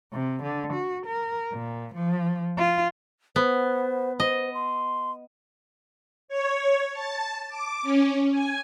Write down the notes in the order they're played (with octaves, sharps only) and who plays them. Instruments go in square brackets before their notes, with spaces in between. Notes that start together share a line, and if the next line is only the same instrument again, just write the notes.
[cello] C3
D3
F#4
A#4
A#2
F3
F4
[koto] B3 [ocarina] C5
[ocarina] C5 [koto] D#5
[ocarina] C6
[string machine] C#5
A5
D6
C#4
G#5